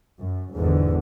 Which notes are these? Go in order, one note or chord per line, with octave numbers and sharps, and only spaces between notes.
F#2
G1 E2 G#2 D3